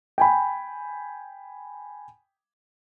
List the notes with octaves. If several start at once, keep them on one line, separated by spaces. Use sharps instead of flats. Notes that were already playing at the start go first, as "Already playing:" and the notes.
G5 G#5 B5